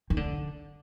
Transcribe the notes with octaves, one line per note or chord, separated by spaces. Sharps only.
D#3
D3